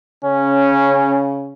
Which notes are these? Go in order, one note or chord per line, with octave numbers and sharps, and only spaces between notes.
C#3 C#4